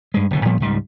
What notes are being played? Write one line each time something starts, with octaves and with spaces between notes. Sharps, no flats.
G2 G#3
F#1 B2 D3
A2 F3 G3 B3
C#2 G#2 C#3 G3